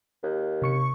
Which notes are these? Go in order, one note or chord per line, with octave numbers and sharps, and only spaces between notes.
D#2
C3 C#6 C#7